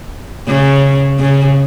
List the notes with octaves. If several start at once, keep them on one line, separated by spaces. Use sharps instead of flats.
C#3
C#3